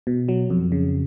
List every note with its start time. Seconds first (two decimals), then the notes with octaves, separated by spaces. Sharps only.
0.07 B2
0.29 F#3
0.50 F2
0.72 C#3